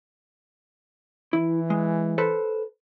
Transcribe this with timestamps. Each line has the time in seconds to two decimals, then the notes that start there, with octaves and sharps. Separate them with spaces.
1.33 E3 E4
1.70 G#3
2.18 A4 B4 C5